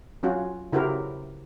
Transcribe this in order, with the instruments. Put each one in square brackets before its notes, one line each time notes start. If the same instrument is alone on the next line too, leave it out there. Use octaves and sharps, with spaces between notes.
[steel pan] F#3 C#4 F4 F#4
C#3 E4 F#4 G4 A#4 C5